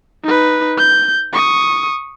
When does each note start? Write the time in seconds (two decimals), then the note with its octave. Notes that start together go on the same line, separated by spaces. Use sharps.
0.24 D#4 B4
0.77 G6
1.33 C#6 D#6